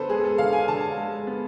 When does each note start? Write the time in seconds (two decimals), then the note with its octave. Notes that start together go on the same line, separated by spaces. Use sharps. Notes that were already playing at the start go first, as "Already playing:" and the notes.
Already playing: D3 B3 A4 B4 C5
0.09 G#3 G#4
0.24 A4
0.38 D3 F5
0.53 G#5
0.68 D3 A5
0.97 G#3
1.27 B3